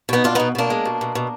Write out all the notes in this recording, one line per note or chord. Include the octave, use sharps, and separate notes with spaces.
B2 B3 D#4
B2 D4 F4
B2 B3 D#4
B2 A#3 D4
G#3
B2
B2
B2